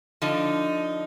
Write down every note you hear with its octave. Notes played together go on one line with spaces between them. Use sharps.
D3 F3 D#4